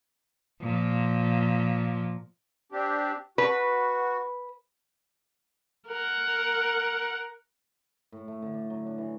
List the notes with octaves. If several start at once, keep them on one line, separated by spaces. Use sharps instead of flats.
A#2 F3
C4 D4 G4
F#4 B4
A#4 F#5
A2
A3
D3
D5
F#3
D4
E3